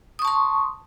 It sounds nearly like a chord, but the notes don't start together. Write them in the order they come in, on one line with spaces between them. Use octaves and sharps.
D#6 C#6 A5 C6